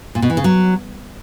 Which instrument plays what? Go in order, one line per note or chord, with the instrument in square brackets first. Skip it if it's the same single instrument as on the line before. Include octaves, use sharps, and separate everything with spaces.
[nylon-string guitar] A#2
B2
E3
C#3
F#3